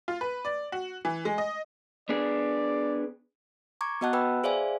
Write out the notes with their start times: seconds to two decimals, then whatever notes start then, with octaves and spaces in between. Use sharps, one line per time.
0.08 F4
0.21 B4
0.45 D5
0.72 F#4
1.05 E3
1.25 G#3
1.38 D#5
2.09 B3 D4 G#4 D5
3.81 A#5 C#6 D6 G#6
4.01 B3 F#4 D#5 F#5 A5 F#6
4.13 B4 G5 B5 E6
4.44 G#4 C5 D5 E5 F5 G#5